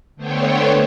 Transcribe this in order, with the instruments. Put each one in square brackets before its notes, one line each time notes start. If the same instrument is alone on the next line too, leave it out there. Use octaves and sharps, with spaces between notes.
[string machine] D3 A3 B3 C5 C#5 G5